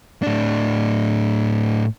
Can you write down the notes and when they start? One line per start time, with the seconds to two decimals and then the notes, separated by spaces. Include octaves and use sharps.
0.23 A2 D4